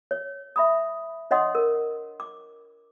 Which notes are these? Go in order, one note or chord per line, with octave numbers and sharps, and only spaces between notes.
C#5
E5 B5 D#6
D4 C#5 D#5 F#5 C6 D#6
A#4
D6